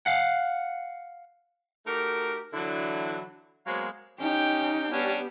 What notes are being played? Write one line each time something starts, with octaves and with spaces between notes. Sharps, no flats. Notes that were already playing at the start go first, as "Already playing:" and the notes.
F5 F#5
A3 D#4 F#4 G4 A#4
D3 E3 F#3 D4 E4
F#3 G#3 A#3 B3 C5 F5
C#4 D#4 G4 G5
G3 B3 C#4 D4 G4